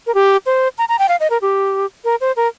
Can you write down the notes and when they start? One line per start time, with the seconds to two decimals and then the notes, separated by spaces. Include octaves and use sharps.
0.07 A#4
0.15 G4
0.46 C5
0.78 A#5
0.89 A#5
0.99 G5
1.09 F5
1.20 D#5
1.30 A#4
1.42 G4
2.04 A#4
2.21 C5
2.37 A#4